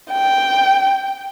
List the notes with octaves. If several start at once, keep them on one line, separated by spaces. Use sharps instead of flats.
G5